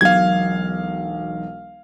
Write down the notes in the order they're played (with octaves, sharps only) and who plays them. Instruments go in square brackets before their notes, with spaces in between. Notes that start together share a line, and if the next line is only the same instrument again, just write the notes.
[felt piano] E1 B1 [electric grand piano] F5 G#6